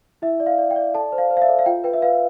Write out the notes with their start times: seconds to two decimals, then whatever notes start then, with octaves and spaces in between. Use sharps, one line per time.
0.22 E4 E5
0.40 D5
0.46 F5
0.58 D5
0.71 G5
0.76 D5
0.94 A4 A5
1.12 C5
1.18 F5
1.31 C5
1.37 F5
1.42 E5
1.49 A4
1.59 F5
1.66 F4 G5
1.84 B4 G5
1.94 E5
2.02 B4 F5